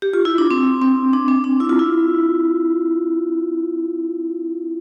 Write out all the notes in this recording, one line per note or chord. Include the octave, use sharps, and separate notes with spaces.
G4
F4
E4
D4
C4
C4
D4
C4
D4
E4
F4
E4